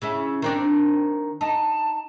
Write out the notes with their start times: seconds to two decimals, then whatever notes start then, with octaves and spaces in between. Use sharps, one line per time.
0.02 C#3 C#4 E4
0.42 D#3 C4 D4
1.41 D#4 A5